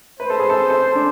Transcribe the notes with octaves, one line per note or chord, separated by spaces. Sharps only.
B4 C5
A4
G#4
A4
A4
D4